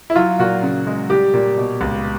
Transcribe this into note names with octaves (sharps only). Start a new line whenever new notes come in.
E4
F#3 F4
A#2 F#4
C#3
G#3
G3 G4
A#2
B2
C#2